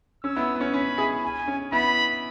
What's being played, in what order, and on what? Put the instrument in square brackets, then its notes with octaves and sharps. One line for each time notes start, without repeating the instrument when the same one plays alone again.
[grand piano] C#4 [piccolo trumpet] E6
[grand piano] B3 E4
B3
C#4
[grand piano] C#4 [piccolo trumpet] B5
[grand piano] E4 G#4
[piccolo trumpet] G#5
[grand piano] C#4
[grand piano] B3 E4 [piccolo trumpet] B5